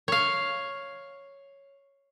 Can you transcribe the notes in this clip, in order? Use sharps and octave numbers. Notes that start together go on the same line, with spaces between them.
C#5 F5